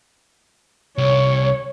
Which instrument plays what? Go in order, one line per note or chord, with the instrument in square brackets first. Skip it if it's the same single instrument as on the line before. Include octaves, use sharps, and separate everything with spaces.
[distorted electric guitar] C2 [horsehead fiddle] C#5